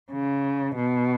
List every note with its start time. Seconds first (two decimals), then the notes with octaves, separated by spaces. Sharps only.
0.11 C#3
0.76 B2